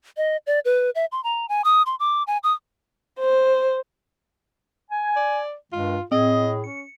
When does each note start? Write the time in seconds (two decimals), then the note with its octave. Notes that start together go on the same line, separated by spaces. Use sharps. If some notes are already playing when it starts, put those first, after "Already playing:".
0.17 D#5
0.47 D5
0.65 B4
0.95 E5
1.12 C6
1.24 A#5
1.49 G#5
1.64 D#6
1.86 C6
2.00 D6
2.27 G#5
2.43 D#6
3.20 C5
4.91 G#5
5.16 D5
5.73 G2 D#3 G#3 F4
6.12 A2 C4 G#4 D#5
6.64 C#4 C#7